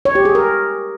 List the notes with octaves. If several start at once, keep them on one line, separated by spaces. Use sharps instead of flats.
C#5
G4
G#4
A#4